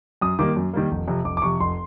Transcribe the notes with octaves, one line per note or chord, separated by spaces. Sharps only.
F#2 D#6
D#3 G3 A#3 D6
F#2
D#3 G3 A#3
F1
F2 C3
F1 D6
D6
F2 C3 C#6
F1 C6